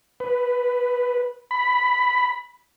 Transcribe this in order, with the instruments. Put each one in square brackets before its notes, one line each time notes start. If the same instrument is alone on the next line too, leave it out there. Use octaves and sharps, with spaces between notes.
[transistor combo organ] B4
B5